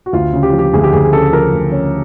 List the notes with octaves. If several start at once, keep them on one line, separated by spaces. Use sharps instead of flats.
F#4
D2 F4
C#3
G4
F3
G4
D2 G#4
G4
D2 G#4
G#4
C#3 A4
F3 A#4
D2
C#3 C#5